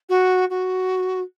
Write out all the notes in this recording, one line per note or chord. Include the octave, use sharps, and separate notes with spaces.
F#4
F#4